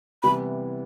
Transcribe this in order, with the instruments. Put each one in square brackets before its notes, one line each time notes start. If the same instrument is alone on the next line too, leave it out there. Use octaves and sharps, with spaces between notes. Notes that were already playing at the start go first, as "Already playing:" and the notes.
[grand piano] C3 E3 G3 B3 E4 [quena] B5